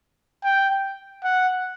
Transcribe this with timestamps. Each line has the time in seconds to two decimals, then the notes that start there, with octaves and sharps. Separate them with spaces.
0.44 G5
1.24 F#5